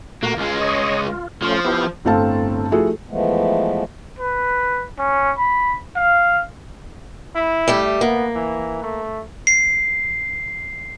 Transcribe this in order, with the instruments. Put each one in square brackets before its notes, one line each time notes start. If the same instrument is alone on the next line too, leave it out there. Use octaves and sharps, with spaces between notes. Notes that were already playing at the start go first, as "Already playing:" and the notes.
[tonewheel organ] A#2 A3 F#4 [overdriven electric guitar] A#3
[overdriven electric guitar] C#2 G#3 [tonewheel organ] F4
[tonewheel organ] C#5 D#5
F4
[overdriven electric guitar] F3 [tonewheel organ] A3 C#4 F4
[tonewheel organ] B3 E4 G4
[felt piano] G1 A2 C4 A4 F5 A5
F3 A3 E4 F#4 G#4 A4
[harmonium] E3 F3 G#3 A3 B3
[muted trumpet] B4
C#4
B5
F5
[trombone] E4
[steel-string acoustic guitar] G3 A3 G4
[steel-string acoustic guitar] A#3 [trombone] B3
[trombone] E3
A3
[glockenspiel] C7